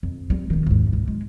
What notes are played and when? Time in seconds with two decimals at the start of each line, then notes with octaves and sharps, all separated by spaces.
0.03 F2
0.30 G3 C4
0.50 D1 D#3
0.67 G#1 D#2
0.93 C#2 G2
1.08 G#3